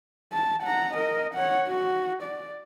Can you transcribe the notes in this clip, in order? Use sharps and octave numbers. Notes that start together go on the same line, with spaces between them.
A5
F#5 A#5
A#4 D#5
C#5 F#5
F#4
D5